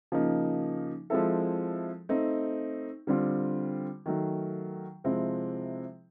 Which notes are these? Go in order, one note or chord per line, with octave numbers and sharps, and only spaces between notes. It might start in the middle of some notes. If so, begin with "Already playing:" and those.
C#3 F3 A#3 D#4
F3 G#3 C4 E4 A4
A3 C4 D#4
D3 G3 C4 F4
D#3 F#3 A3
C3 F3 G#3 C4 E4